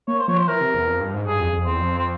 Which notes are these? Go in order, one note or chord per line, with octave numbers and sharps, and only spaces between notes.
A#3 C#5
C5
F3 C#5
C5
E3 A#4
C3
E2
F2
G2
G#2
G2 G#4
F2
F2
E2 C4
F2
C4